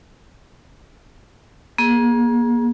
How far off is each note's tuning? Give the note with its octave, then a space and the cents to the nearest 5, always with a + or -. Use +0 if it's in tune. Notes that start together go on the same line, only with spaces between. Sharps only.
A#3 +35 G#4 +0